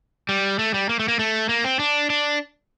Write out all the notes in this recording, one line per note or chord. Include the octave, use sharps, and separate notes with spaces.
G3
A3
G3
A#3
A3
A#3
A3
A#3
C4
D4
D4